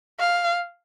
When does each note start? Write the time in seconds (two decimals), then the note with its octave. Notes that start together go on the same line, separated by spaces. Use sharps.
0.20 F5